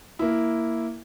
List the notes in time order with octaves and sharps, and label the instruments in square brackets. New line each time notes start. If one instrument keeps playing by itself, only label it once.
[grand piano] A#3 E4